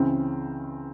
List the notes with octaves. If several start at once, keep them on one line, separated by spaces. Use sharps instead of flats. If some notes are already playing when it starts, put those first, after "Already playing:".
Already playing: C#2 C#3 E3 C4